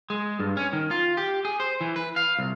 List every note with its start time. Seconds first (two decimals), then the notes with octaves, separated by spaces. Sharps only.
0.10 G#3
0.40 G2
0.57 C#4
0.73 D#3
0.91 F4
1.17 G4
1.45 G#4
1.60 C5
1.81 E3
1.96 B4
2.16 F5
2.39 C2